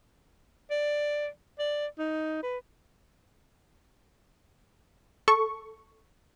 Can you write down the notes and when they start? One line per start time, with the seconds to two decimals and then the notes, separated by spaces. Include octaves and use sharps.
0.70 D5
1.59 D5
1.98 D#4
2.43 B4
5.28 A4 C#6